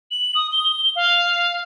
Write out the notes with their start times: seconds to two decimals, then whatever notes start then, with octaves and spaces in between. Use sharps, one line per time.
0.11 F#7
0.35 D#6
0.52 G7
0.96 F5